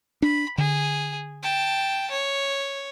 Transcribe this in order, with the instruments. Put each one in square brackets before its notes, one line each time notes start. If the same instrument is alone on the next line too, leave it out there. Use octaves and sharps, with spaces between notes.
[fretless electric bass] D4 [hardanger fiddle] B5
[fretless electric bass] D3 [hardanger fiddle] G#4
[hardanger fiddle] G5 A5
C#5